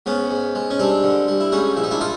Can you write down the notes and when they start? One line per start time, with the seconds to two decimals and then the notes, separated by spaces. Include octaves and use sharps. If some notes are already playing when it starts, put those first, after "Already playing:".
0.06 G#2 B3 C#4
0.31 G#2
0.55 G#3
0.70 C#4
0.79 G3 C4 D4
1.04 D3
1.28 G3
1.40 E4
1.52 G#2 C#4 D#4
1.76 A#1 E4
1.84 D#4
1.91 D4 E4
2.01 D#4 F4